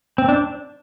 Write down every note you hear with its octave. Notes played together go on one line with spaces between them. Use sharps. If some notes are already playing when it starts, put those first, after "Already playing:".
C4
D4